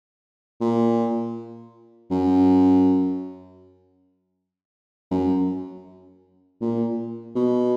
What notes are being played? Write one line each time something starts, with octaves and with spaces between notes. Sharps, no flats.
A#2
F#2
F#2
A#2
B2